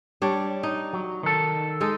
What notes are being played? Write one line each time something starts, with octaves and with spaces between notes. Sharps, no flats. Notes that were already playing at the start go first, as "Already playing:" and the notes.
G3 D4 C#5
D#4
F#3
D#3 A4
G#3 D#4 A4